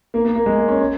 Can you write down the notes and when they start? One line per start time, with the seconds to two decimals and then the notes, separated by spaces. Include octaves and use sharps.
0.14 A#3
0.25 A#3
0.36 A#3
0.46 G#3
0.58 A#3
0.68 C#4
0.80 C#4